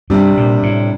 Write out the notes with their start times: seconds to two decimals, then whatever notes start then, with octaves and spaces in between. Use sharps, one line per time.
0.10 G2 C3 G3 D4
0.37 A#2
0.63 A2